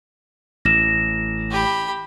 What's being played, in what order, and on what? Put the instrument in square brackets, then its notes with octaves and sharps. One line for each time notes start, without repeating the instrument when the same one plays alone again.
[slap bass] A1 [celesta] A#6 E7
[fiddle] G4 B5